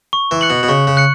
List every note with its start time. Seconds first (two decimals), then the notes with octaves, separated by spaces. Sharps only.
0.13 C#6
0.31 E3
0.41 F#6 C#7 F#7
0.50 B2
0.63 B2
0.68 C#3 C#6
0.87 C#3
0.97 F#6 C#7